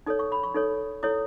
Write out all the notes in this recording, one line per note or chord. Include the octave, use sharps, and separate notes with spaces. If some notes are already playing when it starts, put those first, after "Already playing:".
D#4 A4 C#5 D#6
C#6
B5
C#6
D#4 A4 C#5
E4 A4 C#5 D#6